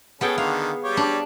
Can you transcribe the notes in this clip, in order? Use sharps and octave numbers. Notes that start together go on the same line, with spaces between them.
B3 C#4 G#4 A4 G5
D3 D#3 F5
G3 G4 C#5
D4